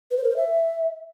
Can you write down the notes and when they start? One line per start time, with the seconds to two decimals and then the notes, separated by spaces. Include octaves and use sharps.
0.11 B4
0.17 C5
0.24 A#4
0.30 C5
0.37 E5